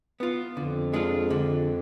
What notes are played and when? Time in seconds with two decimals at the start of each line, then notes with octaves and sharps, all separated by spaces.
0.20 B3 F4
0.56 F2 D3
0.93 G#3 D4 F4
1.30 D3